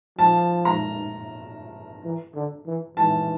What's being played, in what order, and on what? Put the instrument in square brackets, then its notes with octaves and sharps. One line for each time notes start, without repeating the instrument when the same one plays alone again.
[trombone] F3 [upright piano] A5
[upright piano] A#5
[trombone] E3
D3
E3
[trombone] E3 [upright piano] A5